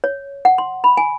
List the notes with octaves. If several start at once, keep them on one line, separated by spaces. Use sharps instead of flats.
C#5
F#5
C6
B5
G#5